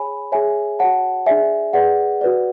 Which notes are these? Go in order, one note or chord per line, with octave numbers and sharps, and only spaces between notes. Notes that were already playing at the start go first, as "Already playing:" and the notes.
Already playing: G#4 C#5 G#5 B5
G#4 C#5 E5 G#5
F#4 C#5 F#5 A5
D4 G#4 D5 E5 G#5
G#4 B4 D5 F#5
F#4 B4 D5